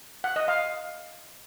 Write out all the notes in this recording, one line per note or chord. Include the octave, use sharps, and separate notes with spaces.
F#5
D#5
F5